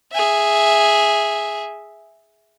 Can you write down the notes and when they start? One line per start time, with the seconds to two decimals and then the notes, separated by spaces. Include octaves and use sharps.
0.13 G#4 E5